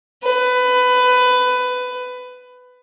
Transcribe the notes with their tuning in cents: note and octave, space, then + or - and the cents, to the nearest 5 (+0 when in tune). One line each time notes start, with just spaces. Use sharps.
B4 +20